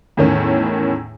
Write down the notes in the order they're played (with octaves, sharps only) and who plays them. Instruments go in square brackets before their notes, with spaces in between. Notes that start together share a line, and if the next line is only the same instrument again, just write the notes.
[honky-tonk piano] E2 A2 D#3 C#4